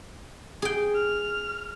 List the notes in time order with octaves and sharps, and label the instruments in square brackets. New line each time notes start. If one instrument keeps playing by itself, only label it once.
[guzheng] G#4 G5
[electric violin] F6